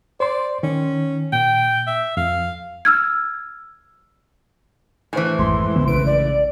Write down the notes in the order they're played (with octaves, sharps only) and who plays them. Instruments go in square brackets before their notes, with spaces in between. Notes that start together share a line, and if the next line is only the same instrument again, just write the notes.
[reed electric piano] C5 C6 [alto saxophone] D5
[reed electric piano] D#3 [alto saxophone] C#4
[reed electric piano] A#2 [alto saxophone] G5
[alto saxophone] E5
[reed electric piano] F2 [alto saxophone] F5
[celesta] E6 F6 G#6
[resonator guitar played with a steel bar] A2 E3 [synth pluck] C5 G#5
[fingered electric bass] G#1 [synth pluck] F2 G#3 [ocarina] C6
[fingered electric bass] C2 D3 B3
[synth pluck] A#1 D7 [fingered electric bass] C#3 [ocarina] B4
[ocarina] D5